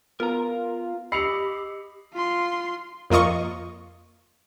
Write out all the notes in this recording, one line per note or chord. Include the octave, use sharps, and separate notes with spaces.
B3 F4 A#4 A#5
G4 D#5 B5 E6 C7 C#7 F7
F4 C6
F2 A#3 F4 D#5 C#6